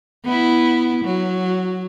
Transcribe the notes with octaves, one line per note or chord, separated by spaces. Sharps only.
B3 E4
F#3